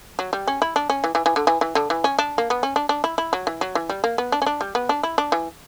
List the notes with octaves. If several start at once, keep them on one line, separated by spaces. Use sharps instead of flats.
F#3
G3
C#4
E4
D4
C#4
E3
E3
E3
D3
E3
E3
D3
E3
C#4
D4
A#3
B3
C#4
D4
D4
E4
E4
F#3
E3
F#3
E3
G3
A#3
B3
D4
C#4
D4
G3
B3
D4
E4
D4
E3